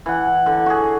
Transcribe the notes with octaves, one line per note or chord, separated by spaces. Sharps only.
E3 F#5
D3
F#4 G#4